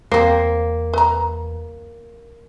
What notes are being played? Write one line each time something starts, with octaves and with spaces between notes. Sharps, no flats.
E2 A#3 C4 C5
B4 A#5